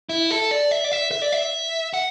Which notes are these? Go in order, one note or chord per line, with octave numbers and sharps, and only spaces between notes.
E4
A4
D5
E5
D5
E5
E5
D5
E5
F#5